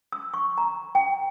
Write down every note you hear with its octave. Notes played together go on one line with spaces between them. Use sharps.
E6
C#6
A#5
G5